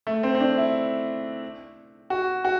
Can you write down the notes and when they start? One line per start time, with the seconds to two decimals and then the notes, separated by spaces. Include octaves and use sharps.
0.07 A3
0.23 C4
0.35 C4
0.40 D4
0.57 E4
2.10 F#4
2.45 F#4